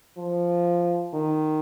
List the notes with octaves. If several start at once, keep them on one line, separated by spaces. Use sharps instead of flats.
F3
D#3